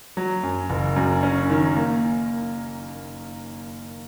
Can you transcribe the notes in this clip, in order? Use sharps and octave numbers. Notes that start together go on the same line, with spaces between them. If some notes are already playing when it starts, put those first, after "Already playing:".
F#3
F#2
F#1
F#2
C#4
D#3
A#3